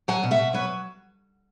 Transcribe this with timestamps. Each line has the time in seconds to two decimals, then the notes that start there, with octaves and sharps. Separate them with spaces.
0.08 F#3 F#5 G#5
0.23 B2
0.31 E5 F#5
0.38 B2
0.53 F#3 B4 C#5